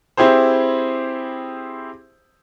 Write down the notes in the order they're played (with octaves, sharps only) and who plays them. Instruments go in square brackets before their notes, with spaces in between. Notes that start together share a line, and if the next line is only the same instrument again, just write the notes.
[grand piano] C4 E4 G4 G#4 C5